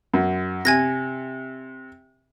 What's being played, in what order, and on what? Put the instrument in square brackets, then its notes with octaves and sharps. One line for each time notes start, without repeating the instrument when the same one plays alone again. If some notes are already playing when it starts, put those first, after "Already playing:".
[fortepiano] F#2
[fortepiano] C3 [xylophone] G#5 G#6 A#6